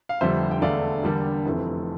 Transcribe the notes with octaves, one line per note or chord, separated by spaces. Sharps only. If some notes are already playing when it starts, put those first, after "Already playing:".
F5
F1 F2 D3 G3 C5 E5
G5
E1 E2 D3 A3 D5 F5
E2 D3 G3 A#3 D4
F1 F2 E3 A3 C4